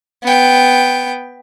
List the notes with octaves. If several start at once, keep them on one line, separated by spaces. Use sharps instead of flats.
B3 G5